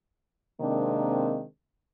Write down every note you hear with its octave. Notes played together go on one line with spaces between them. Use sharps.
C3 D#3 G#3 A#3 C4 D4